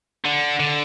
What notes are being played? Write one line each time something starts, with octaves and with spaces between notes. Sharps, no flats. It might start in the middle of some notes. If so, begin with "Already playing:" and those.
D3
D3